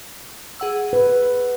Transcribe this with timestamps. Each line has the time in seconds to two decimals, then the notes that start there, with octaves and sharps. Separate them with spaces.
0.60 G#4 F#5 E6
0.93 B4